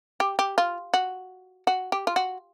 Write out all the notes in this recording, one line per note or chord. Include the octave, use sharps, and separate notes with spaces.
G4
G4
F4
F#4
F#4
G4
F4
F#4